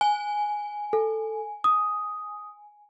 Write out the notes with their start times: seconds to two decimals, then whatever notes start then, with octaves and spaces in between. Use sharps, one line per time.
0.01 G#5
0.93 A4
1.64 D#6